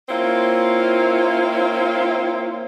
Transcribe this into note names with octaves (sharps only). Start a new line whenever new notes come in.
A#3 C4 C#4 E4 F4